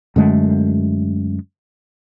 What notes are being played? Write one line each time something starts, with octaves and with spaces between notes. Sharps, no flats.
F#2 D3 G#3 A3